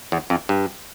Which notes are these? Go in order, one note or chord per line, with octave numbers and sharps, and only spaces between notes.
E2
F2
G2